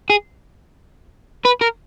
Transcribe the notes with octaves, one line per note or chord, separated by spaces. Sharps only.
G#4
B4
A#4